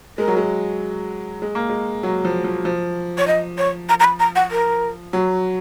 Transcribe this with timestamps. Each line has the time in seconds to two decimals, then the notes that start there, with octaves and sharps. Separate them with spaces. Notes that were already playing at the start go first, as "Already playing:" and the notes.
0.18 G#3 A#4
0.28 F#3
0.37 G#3
1.42 G#3
1.55 A#3
1.69 G#3
2.03 F#3
2.25 F3
2.44 F3
2.65 F3
3.18 C#5
3.27 D#5
3.58 C#5
3.89 A#5
4.00 A#5
4.04 B5
4.20 A#5
4.36 F#5
4.51 A#4
5.13 F#3